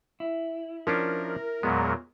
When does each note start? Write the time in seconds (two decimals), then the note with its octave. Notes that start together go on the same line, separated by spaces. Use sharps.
0.20 E4
0.87 F3 C#4 D4 A#4
1.63 E2 A#2 F#3 G#3 B3